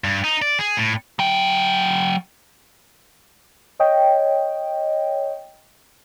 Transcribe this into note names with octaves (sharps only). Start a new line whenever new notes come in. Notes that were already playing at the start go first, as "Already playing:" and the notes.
G2
D#4
D5
G#4
A2
F#3 G5
C#5 D#5 G5